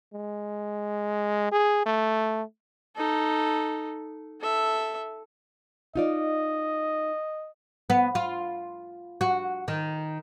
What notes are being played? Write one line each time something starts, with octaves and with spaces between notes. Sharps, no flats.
G#3
G#4
A3
D#4 A4
A4 E5
D#4 F4 D5 D#5
B3
F4
F#4
D#3